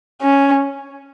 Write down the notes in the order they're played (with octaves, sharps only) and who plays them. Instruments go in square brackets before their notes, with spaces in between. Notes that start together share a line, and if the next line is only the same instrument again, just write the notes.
[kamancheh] C#4